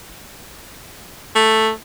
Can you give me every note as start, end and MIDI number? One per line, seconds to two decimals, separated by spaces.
1.35 1.70 57